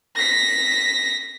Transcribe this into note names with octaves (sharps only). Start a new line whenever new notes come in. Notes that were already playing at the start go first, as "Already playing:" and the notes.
A#6 B6